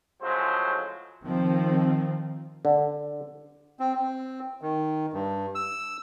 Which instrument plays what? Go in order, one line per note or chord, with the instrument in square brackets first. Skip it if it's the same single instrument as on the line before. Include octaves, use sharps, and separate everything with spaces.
[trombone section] A2 C#3 F3 F#3 G#3 C5
[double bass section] D#3 F3 C4
[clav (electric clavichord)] D3
[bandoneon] C4
C4
D#3
G2
E6